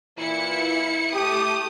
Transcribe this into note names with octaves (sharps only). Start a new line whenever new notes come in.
A#2 E3 E4 C#7
A3 G4 D#6